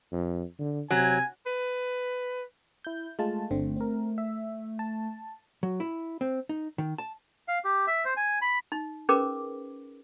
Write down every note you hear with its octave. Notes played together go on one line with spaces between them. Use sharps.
F2
D3
C3 F#3 G#5
B4
E4 G6
G#3 A3 F4 A5
G1 D3 C4
C4 A#4
E5
A5
F#3
E4
C4
D#4
D#3
A5
F5
G4
E5
C5
G#5
B5
D#4
C#4 G#4 A#4 B4 D6